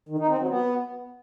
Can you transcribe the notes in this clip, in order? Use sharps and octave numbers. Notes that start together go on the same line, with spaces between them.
D#3
D#4
C4
F#3
B3